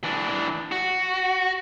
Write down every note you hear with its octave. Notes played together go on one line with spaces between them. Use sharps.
E3 D4
F#4